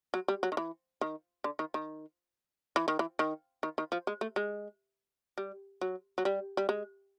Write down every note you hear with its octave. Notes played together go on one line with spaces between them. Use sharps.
F#3
G3
F#3
D#3
E3
D#3
D3
D#3
D#3
E3
D#3
E3
D#3
D#3
D#3
F3
G#3
A3
G#3
G3
F#3
F#3
G3
G3
G#3